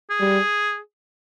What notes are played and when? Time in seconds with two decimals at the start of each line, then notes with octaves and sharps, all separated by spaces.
0.10 G#4
0.20 G3